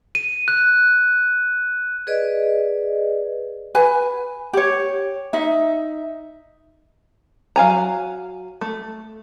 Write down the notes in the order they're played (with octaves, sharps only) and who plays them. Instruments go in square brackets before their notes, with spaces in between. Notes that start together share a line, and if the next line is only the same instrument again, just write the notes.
[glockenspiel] D#7
F#6
[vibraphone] G#4 B4 D5 D#5
[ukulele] B4 G#5
G4 C#5
D#4 E5
[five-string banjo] F#3 F5 G#5 A#5
A3